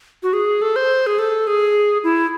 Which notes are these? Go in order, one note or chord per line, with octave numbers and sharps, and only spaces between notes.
F#4
G#4
A4
C5
G#4
A4
G#4
E4